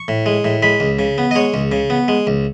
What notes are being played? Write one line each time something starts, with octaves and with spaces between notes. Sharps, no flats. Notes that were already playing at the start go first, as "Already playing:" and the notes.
Already playing: C#6
A2
G#3
A2
G#3 B5
C#2
C#3
B3
D#5
G#3 C#5
C#2
C#3
B3
G#3
C#2